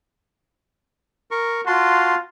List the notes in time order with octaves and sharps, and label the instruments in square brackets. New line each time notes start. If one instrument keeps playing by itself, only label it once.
[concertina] A#4 C#6
[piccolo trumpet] F4 [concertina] F#4 A5 C6